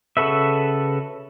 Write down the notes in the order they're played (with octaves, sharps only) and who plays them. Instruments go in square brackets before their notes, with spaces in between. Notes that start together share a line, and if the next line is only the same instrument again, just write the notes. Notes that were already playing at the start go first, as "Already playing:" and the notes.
[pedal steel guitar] C#3 F#4 A4 B4 E5